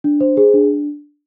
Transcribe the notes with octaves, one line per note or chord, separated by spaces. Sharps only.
D4
C5
G#4
D4